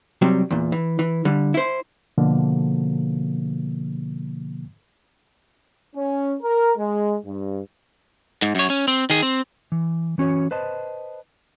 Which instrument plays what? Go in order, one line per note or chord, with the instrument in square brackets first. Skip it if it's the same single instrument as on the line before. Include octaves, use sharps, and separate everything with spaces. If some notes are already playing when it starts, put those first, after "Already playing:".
[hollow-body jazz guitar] C3 F#3 G3
E2 A#2
E3
E3
D3 G3
E4 C5
[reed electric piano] B2 D3 F3 A#3
[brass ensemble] C#4
A#4
G#3
G2
[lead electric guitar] G#2
F#2 C#5
C#4
C4
D#3 G#4
C4
[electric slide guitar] E3
E3 C#4 F#4 C#5
B4 C5 D#5 A5